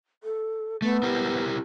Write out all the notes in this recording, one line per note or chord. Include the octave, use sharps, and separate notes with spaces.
A4
A3 B3
E4 G4 A#4